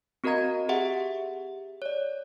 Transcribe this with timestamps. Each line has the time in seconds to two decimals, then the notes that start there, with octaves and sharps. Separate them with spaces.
0.24 C4 F#4 A#4 D#5 A#5 G#6
0.69 G4 G#4 E5 F#5
1.82 C#5 D5